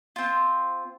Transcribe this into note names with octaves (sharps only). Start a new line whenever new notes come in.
C4 F4